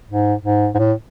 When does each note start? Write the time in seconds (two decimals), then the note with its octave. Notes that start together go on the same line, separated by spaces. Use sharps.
0.10 G#2
0.44 G#2
0.75 G#2
0.78 A2